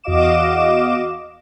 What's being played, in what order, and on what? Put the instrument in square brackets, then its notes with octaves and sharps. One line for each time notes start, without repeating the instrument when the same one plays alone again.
[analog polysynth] E2 F#4 D#5 F5 D6 E7